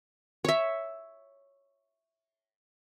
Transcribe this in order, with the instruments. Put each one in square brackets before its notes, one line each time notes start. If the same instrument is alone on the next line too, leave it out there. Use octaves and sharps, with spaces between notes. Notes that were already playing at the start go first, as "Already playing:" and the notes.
[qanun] C#5 E5